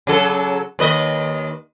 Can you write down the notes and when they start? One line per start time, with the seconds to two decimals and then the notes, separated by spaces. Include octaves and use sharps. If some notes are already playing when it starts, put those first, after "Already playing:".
0.07 C#3 F#3 A4
0.79 D#2 B4 D#5